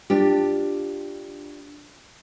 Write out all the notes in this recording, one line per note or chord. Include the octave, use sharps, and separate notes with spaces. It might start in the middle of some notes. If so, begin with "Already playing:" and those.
D4 F4 G4